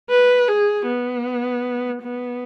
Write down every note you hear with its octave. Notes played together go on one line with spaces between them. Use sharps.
B4
G#4
B3
B3